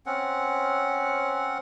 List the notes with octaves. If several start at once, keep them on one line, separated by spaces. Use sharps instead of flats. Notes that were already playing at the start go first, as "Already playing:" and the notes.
C4 C#4 F#5